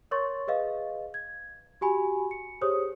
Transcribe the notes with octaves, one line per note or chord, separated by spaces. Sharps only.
A#4 C#5 C6 C#6 A6
G#4 B4 D#5 F5
G#6
F#4 G4 G#5 B5
C#7
G4 G#4 C5 C#5 D#6